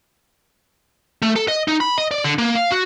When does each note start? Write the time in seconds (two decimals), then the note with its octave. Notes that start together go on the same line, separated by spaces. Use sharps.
1.22 A3
1.36 A4
1.48 D#5
1.68 D#4
1.80 B5
1.98 D#5
2.11 D5
2.24 D3
2.38 A#3
2.55 F5
2.72 F#4